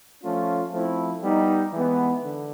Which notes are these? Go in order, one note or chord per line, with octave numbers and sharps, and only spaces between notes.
F3 A3 C#4 F4
F3 A3 C4 E4
G3 B3 D#4
E3 G#3 B3
D3